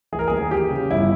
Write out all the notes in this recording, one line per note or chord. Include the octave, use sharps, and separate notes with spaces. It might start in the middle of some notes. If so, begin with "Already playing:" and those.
E3 G#4
A#4
D#2 G#4
E3 G4
C#3
G1 E4